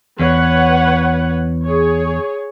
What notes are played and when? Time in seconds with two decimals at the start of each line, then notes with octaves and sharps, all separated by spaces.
0.20 E2 B4 C#5 F#5
1.65 G#4 C#5